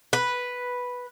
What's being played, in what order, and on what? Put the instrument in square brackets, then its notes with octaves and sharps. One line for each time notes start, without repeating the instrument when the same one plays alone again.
[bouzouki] B4